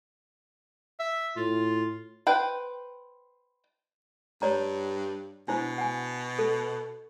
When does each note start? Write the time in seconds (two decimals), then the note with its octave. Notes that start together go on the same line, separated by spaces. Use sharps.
1.00 E5
1.37 A2 F4
2.27 B4 C5 G5
4.42 G2 C#5 D5 A#5
5.48 B2 D4 E4 C5
5.78 F#5 G#5
6.39 A4